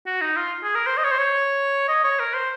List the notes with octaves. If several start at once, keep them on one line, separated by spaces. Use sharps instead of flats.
F#4
D#4
F4
G#4
A#4
C5
D#5
C#5
C5
C#5
D#5
C#5
A#4
C5